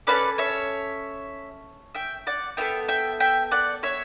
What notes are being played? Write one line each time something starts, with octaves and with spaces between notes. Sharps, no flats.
C#4 F#4 A4 B4 D5
C#5 E5
E5 G5
D5 F#5
B3 F#4 A4 E5 G5
E5 G5
E5 G5
D5 F#5
C#5 E5